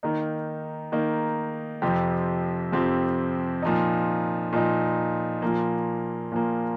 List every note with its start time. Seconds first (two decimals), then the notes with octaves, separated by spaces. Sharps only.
0.03 D#3 A#3 D#4
0.92 D#3 A#3 D#4
1.82 F2 C3 F3 C4 G4
2.72 F2 C3 F3 C4 G4
3.62 A#2 F3 D#4
4.53 A#2 F3 D#4
5.42 A#2 F3 A#3
6.32 A#2 F3 A#3